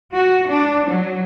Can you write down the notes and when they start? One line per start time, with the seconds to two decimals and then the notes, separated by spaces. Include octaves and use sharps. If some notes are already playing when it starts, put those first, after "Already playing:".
0.14 F#4
0.49 D4
0.89 F#3